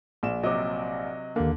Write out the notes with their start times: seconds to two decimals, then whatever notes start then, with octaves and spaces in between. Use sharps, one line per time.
0.23 A#1 E7
0.43 C3 F#3 D#5 D6
1.36 D#2 D3 A#3